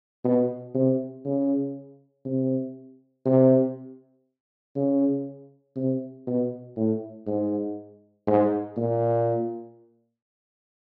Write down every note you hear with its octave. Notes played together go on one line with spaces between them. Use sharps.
B2
C3
C#3
C3
C3
C#3
C3
B2
A2
G#2
G#2
A#2